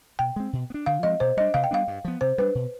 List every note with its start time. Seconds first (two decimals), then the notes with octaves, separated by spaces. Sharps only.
0.19 B2 G5
0.36 G#3 C4
0.53 B2
0.70 B3
0.74 D4
0.86 D3 F5
1.03 F3 G#3 C4 D#5
1.20 B2 C5
1.37 G3 D#5
1.40 D4
1.54 C3 F5
1.64 G5
1.71 G3 B3 D4 F5
1.88 G2
2.05 F3 B3
2.21 C3 C5
2.38 G3 B3 D4 B4
2.55 B2